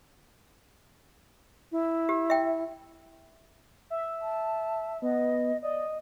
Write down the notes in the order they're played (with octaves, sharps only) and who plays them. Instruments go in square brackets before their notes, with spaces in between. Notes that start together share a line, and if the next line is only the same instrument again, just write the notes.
[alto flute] E4
[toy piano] G4
E5 G5
[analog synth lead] E5
[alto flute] A5
[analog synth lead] B3 [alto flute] D#5
[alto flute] D5 [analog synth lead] D#5